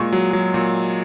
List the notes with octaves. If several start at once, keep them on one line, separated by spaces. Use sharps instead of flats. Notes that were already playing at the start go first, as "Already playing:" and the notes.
Already playing: A#2 G#3 C#6
F#3
F#3
A#2